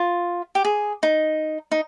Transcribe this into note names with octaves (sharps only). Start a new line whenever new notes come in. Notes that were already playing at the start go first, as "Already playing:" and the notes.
Already playing: F4
G4
G#4
D#4
D#4